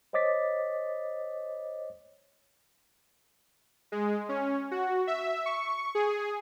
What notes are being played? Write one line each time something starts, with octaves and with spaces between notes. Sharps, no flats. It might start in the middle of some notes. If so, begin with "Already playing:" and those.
C5 C#5 D#5 D6 A6 B6
G#3
C#4
F#4
E5
C#6
G#4